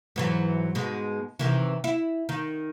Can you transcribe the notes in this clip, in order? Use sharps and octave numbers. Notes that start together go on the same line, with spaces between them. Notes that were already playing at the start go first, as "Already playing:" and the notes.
G#2 E3 F#3
G#2 B2 G#3
C3 D#3 E3
E4
D#3